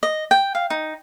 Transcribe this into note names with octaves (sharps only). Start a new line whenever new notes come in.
D#5
G5
F5
D#4